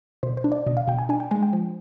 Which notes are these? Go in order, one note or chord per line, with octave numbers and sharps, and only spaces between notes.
B2 C5
C5
D4
D5
B2 D#5
F5
B2 G5
G#5
D4 G#5
G5
G#3 G#5
G5
F3